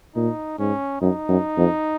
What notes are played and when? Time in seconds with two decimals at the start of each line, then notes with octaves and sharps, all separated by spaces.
0.15 A#2 D#4
0.59 G#2 C#4
1.01 F#2 D#4
1.29 F#2
1.57 F2